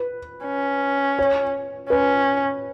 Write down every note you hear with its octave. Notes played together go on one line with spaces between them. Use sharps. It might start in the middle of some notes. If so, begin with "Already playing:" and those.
Already playing: B4
C#4
C#5
C#4 B4